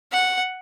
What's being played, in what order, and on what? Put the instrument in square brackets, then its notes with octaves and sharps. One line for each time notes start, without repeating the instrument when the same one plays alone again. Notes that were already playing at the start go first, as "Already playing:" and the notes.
[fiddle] F#5